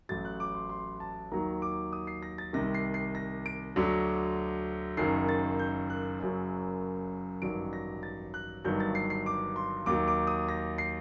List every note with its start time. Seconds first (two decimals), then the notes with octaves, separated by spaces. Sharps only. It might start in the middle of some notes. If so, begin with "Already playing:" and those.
0.09 A1 A2 F#3 A6
0.25 F#6
0.40 D6
0.55 C6
0.70 C6
1.00 A5
1.32 D#2 D#3 F#3 A#5
1.62 D6
1.93 D#6
2.07 C7
2.23 A#6
2.38 A6
2.53 C2 C3 D#3 A#6
2.74 C7
2.94 C7
3.15 A#6
3.46 D7
3.76 D2 D3 F#3
4.97 F#1 F#2 D#3 C7
5.29 A6
5.59 G6
5.90 F#6
6.20 F#1 F#2 F#3
7.42 A1 G2 D#3 F#3 D7
7.73 A#6
8.03 A6
8.34 F#6
8.65 G1 G2 D#3 F#3 G6
8.80 A6
8.95 C7
9.10 C7
9.26 D6
9.56 C6
9.86 D#2 D#3 F#3 D6
10.08 D6
10.27 D#6
10.48 A#6
10.78 C7